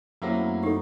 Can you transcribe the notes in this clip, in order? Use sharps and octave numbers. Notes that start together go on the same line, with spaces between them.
F#2 F#3 A3 A#3 C4 E4
D#4 G4 A4